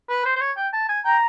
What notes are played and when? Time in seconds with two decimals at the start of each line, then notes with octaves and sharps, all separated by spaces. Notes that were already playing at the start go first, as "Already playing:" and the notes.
0.10 B4
0.26 C5
0.36 C5
0.41 C#5
0.57 G5
0.73 A5
0.89 G#5
1.05 G5 A#5